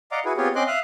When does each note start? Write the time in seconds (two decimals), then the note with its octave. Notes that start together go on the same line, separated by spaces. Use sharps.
0.12 D5 D#5 F5 F#5 A#5 D6
0.25 E4 F#4 G#4 B4
0.37 B3 C4 F4 G4 G#4 C#5
0.56 C4 C#4 D#5 C6 D6 F#6
0.67 E5 F5 D#6 F#6